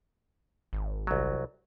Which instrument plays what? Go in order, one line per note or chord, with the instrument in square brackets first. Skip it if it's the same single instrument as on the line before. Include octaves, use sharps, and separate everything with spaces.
[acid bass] G#1
[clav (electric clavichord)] C2 F#3